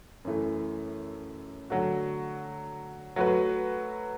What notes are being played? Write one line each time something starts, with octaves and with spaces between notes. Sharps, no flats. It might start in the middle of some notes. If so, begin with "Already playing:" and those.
F#2 E3 A3
D3 F#3 A3 F#4
F#3 A3 F#4 B4